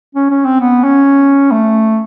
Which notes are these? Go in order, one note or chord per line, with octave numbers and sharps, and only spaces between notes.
C#4
C#4
C4
B3
C#4
A3